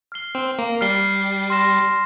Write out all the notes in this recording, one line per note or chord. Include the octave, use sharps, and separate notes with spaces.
F6 C7 G7
C4
A#3
G3 F6 C7 G7
C6 F6 A#6 E7